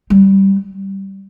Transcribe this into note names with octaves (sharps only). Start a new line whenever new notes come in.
G3